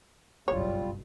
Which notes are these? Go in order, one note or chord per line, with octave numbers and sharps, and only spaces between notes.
F#1 B1 G2 G3 F4 C#5